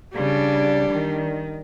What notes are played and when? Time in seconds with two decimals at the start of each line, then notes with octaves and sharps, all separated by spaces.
0.14 C#3 G3 D4
0.89 D#3